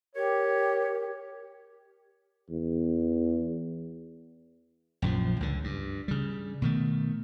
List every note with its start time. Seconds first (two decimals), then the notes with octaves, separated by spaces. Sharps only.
0.15 G4 A#4 C#5
2.50 E2
5.02 A#1 F#2 D3 F3
5.40 C#2 D3
5.64 G2
6.08 C#3 G3
6.62 B2 D#3 A3